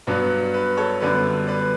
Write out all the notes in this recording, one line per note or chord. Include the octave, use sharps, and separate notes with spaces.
G2 F#3 B3 D4 B4
B4
A4 C#5
F#2 D3 G3 B3 B4 D5
B4 D5